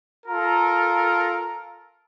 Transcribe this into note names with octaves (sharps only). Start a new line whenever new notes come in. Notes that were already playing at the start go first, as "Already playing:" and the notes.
F4 A4 A#4 A#5